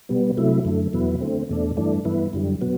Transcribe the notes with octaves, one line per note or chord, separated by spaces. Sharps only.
B2 G3 B3
C3 F#3 A3 E4
F#2 D3 A3
E2 B2 F#3 B3 E4
D3 A3 C4
E2 B2 A3 D4
G2 E3 A3 D4
G2 E3 B3 E4
F#2 D3 G3
B2 F#3 B3